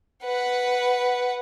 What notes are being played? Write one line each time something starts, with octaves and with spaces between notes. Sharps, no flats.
B4 F#5